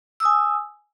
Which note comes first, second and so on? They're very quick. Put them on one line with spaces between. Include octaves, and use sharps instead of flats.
E6 D#6 G#5